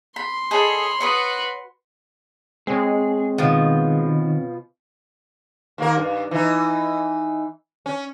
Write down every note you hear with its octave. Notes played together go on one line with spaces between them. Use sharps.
B5 C6
G#4 A4 C#5 D#5 B5
F#4 B4 C#5 B5 D#6
G#3 C4 G#4 C#5
B2 D#3 F3
D#2 A#3 A#4
G2
E3 D#4
C#4